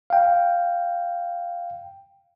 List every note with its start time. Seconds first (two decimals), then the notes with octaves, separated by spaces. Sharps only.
0.10 F5 G5